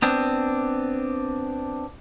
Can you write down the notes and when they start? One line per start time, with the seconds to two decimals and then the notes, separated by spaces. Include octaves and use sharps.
0.02 B3 C4 D4